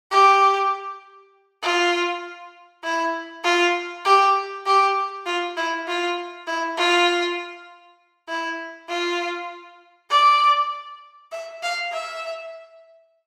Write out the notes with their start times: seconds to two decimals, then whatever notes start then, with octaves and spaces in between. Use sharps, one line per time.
0.11 G4
1.63 F4
2.84 E4
3.44 F4
4.05 G4
4.66 G4
5.26 F4
5.57 E4
5.88 F4
6.47 E4
6.78 F4
8.29 E4
8.89 F4
10.10 D5
11.32 E5
11.63 F5
11.93 E5